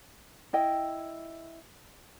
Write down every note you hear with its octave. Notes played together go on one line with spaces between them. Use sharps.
E4 D#5 G5